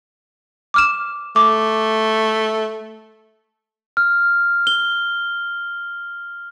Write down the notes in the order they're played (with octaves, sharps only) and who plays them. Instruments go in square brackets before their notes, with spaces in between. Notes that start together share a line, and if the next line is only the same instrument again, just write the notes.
[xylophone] D6 F6 E7
[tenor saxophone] A3 [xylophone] D6
[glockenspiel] F6
G7